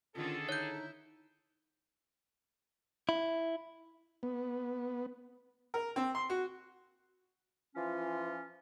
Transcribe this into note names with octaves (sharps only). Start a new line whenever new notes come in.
D3 D#3 C#4 F4 G#4 A4
D#4 E4 C#5 G6
E4
B3
A#4
C4
C6
F#4
E3 F3 C#4 F4